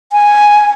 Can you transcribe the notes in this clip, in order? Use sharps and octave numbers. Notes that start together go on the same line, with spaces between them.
G#5